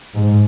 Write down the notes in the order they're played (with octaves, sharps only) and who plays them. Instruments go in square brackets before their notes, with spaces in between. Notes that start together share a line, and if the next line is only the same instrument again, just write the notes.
[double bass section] G#2